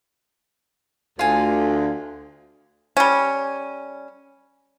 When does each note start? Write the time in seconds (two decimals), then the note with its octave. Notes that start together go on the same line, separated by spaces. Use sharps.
1.19 D2 F4 G#5
2.97 G3 C#4